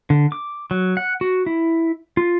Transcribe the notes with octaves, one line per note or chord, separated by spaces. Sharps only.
D3
D6
F#3
F#5
F#4
E4
F4